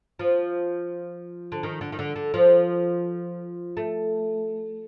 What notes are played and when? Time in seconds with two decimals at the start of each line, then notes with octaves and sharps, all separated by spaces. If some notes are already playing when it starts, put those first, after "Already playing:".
0.19 F3
1.52 D3
1.63 D#3
1.81 D3
1.92 D#3
1.99 D3
2.16 D3
2.34 F3
3.77 A3